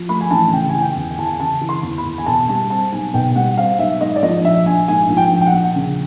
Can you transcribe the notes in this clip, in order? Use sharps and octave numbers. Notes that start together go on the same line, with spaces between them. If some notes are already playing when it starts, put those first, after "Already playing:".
Already playing: F3
A3 B5
G#5
A1 A5
C#3 G5
G#5
E3
G5
E2
G#5
E2 A5
G#5
C#3 A5
E3
C6
E2
B5
E2
G#5
B2 A5
G3 A5
C4 A5
B1 G#5
B2 G5
G3 F#5
C4 F5
B1 E5
G#2 D#5
D5
F3 D#5
A#1 E5
A#1 G#5
G#2 G#5
F3
G5
A#1
G5
F#5
A#1
C#3